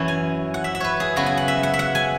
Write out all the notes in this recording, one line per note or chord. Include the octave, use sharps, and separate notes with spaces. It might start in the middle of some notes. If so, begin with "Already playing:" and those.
Already playing: F#2 E3 C#4 E4
G#5
F#5
E5
E5
B4 C#5
G#4
C#3 F#3 B3 E4 F#4
G#5
F#5
E5
F#5
E5
F#5
G#5